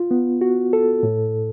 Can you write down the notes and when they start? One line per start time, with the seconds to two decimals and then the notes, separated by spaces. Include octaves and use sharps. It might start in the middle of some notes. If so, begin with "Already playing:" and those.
Already playing: F4
0.11 B3
0.41 F#4
0.73 A4
1.03 A2